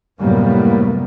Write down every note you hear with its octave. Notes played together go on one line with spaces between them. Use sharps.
F#2 A2 C3 G3 A#3 B3